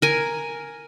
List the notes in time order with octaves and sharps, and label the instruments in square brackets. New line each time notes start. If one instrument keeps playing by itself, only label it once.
[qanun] A#4 G#5